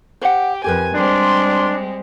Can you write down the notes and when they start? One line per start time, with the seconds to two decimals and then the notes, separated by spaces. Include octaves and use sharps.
0.21 G4 C5 F#5
0.64 F2 G4 A#4 B4 G#5
0.95 G3 G#3 C4 D4 C6